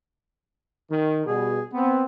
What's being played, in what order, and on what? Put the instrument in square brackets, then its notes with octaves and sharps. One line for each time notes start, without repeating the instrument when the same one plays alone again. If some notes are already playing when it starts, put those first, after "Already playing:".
[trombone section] D#3
[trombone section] B2 G3 [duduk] G#4
[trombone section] B3 [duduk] C4